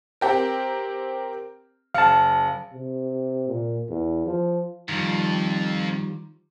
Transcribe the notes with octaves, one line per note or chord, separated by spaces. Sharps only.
C4 G4 A#4
F#1 F5 A5 C#7
C3
A#2
E2
F3
F2 D#3 F3 G3